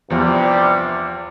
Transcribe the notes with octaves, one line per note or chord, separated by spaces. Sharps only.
E2 G2 C3 F3 G3